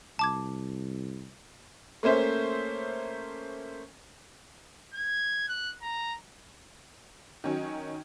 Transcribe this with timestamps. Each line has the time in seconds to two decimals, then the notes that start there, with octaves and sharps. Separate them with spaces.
0.19 C2 A5 D6 G#6
2.03 A3 A#3 C#4 C5 E5
4.94 G#6
5.49 F#6
5.83 A#5
7.44 D#3 F#3 C#4